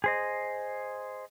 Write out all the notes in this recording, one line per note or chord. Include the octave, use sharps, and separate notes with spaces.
G#4 C5 D#5